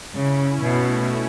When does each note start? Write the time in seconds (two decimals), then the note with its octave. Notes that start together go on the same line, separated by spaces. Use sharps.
0.14 C#3 C#4 E4
0.62 B2 A3 C#4